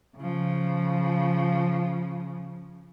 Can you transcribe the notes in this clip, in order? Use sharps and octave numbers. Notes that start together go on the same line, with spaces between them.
C#3 F3